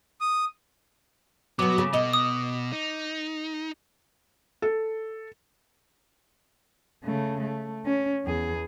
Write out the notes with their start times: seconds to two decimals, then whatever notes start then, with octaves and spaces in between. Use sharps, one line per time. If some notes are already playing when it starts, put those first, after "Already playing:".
0.21 D#6
1.59 B2 F#3 B3 D6
1.78 C#3
1.93 B2 D#5
2.13 D#6
2.72 D#4
4.62 A4
7.05 C#3 A3
7.41 A3
7.86 C#4
8.25 E2 G#4